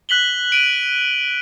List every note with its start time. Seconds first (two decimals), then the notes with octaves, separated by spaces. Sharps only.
0.09 F#6 B6 F#7 G7
0.52 D7 D#7